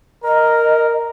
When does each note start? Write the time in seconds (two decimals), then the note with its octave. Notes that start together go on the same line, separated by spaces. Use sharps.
0.24 A#4 D#5